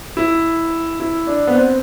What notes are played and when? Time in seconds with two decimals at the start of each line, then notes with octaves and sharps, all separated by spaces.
0.17 E4
1.00 E4
1.27 D4
1.47 B3
1.54 C4